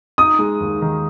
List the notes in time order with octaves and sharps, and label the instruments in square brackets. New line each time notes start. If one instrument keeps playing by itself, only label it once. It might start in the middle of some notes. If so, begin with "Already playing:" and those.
[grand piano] D#4 [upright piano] D#6
[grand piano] G#3
D#2
D#3